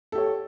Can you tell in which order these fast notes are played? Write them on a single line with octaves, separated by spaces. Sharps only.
A4 G4 C#5